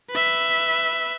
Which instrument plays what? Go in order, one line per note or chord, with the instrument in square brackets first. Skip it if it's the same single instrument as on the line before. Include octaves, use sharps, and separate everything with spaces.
[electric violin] B4 E5